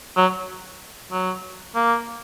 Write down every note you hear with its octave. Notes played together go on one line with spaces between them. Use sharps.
F#3
F#3
A#3